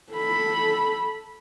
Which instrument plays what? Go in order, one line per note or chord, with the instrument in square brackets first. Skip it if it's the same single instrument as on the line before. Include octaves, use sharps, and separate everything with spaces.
[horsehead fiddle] A4 B5